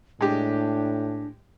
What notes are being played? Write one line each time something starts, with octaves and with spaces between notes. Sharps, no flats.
A2 G#3 D4 G4